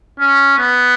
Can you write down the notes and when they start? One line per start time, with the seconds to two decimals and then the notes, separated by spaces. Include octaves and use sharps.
0.19 C#4
0.58 B3